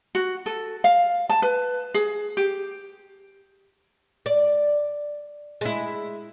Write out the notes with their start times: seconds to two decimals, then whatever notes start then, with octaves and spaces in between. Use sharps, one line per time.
0.15 F#4
0.46 A4
0.84 F5
1.29 A5
1.42 B4
1.94 G#4
2.37 G4
4.26 D5
5.61 G#3 E4